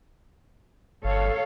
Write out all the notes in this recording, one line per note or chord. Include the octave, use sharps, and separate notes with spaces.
G1 A4 C#5 F5